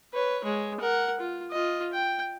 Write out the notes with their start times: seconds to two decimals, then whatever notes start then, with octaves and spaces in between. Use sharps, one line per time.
0.14 B4 C#5
0.44 G#3 C#5
0.80 A#4 F#5
1.20 F4
1.51 F4 D#5
1.93 G5